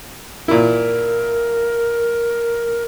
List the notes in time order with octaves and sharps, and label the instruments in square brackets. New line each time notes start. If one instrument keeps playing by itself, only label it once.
[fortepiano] A#2 E4 [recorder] A#4